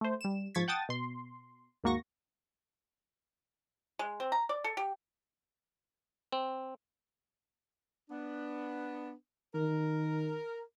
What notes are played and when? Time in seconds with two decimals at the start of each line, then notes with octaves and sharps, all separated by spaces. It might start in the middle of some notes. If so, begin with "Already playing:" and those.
0.01 A3 C5
0.21 G3 E7
0.55 G#2 F3 C#6 G#6 A6 B6
0.68 F#5 G5 A5 D#6 A6
0.89 B2 C6
1.84 D#2 G#2 A#3 F#4 C#6 A#6
3.99 G#3
4.20 C4
4.32 A#5
4.49 D5
4.64 A4
4.77 G4
6.32 C4
8.10 B3 D4
9.55 D#3 A#4